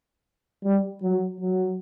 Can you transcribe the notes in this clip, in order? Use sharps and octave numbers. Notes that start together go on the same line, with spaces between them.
G3
F#3
F#3